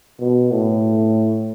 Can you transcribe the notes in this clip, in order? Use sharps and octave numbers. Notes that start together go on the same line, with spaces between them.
B2
A2